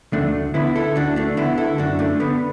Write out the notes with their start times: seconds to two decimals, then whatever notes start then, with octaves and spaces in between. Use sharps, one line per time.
0.13 D2 A3 D4
0.54 D3 B3 E4
0.75 E4 A4
0.95 D2 D4 F#4
1.16 A3 D4
1.37 D3 B3 E4
1.58 E4 A4
1.78 F#2 D4 F#4
1.99 A3 D4
2.20 D3 B3